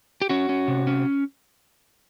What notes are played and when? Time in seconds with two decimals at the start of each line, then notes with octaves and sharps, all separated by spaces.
0.22 G4
0.29 C#4 F#4
0.49 C#4
0.68 C3
0.87 C#4